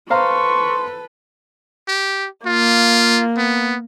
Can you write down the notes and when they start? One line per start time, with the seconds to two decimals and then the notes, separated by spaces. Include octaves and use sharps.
0.10 A4 B4 C5 F5 A#5 C6 C#6
1.88 G4
2.46 A#3 F4
3.38 B3